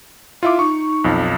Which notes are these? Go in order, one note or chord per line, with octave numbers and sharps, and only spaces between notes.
E4 F4 E5 D6
D#4 C#6
B1 F2